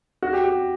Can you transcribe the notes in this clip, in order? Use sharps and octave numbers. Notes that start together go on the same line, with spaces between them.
F#4
G4
G4